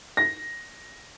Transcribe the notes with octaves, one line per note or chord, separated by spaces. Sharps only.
A#6